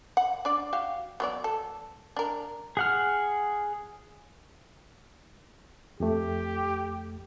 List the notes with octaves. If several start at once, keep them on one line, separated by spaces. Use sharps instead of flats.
F#5
D4 D5
F#4 G4 F5
F#3 B3 D5
A4
D4 A#4
G#4 F#5 F6
F2 A3 G4